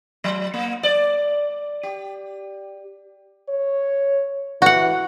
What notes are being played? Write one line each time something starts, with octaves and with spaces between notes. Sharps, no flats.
F#3
A#3
D5
G4
C#5
E3 F#4 F#5